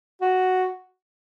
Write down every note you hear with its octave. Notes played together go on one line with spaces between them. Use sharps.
F#4